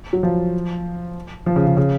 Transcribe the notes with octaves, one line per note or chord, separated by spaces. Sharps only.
F#3
F3
F3
C#3
C#3
C#3